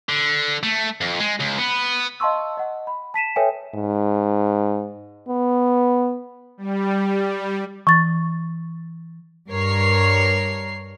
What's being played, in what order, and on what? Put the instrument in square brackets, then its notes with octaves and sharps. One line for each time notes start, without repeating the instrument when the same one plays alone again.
[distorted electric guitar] D3
A3
F2
G#3
C#2
B3
[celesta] D#5 F5 A5 C6 C#6 E6
D#5 F#5
B5
A5 B6 D#7 E7
A4 B4 C#5 E5 G5 G#5
[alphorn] G#2
B3
[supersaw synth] G3
[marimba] E3 A6 [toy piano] C#6
[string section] G2 A#4 C#5 C7